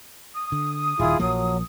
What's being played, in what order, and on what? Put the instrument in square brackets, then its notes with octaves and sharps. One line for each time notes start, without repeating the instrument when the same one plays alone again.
[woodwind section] D#6
[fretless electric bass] D3
[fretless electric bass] D#1 D#3 [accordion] E4 F4 G#4
[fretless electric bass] A#1 F3 A#3 [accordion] F#3